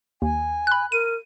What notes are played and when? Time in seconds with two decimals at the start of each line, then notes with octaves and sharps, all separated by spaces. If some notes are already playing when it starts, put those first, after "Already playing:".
0.22 D#2 G#5
0.67 B5 F#6
0.92 A#4 D#7